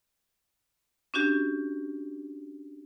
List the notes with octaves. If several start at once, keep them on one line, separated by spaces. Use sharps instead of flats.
C#4 D4 F#4 G4